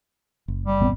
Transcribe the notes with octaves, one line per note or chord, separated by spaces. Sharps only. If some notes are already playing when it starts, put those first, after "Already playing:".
F#1
G3
A1 B3 C4